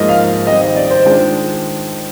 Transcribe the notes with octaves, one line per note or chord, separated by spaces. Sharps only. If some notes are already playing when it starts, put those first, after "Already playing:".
Already playing: G#2 F3 A#3 D#4 D#5
F5
D#3 G3 C4 D#5
D#5
D5
C5
D#3 G#3 D4 F4